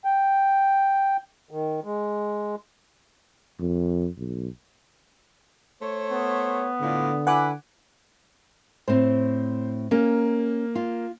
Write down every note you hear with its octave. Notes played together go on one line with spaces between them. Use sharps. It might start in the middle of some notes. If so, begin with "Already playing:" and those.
G5
D#3
G#3
F2
B1
A3 C5 C#5
B3
A2 D3 D4 F4
E4 B4 F#5 G#5 D6
A2 C4 C5
A#3 C#4
F4